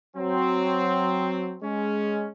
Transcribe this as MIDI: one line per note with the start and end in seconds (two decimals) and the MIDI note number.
0.17 1.57 54
0.17 1.57 60
1.63 2.28 56
1.63 2.28 61